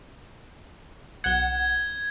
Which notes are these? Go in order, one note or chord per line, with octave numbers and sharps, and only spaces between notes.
B1 F#5 G#6 G7